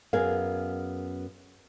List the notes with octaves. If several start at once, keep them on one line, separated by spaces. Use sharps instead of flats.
F#2 B3 G#4 A#4 F5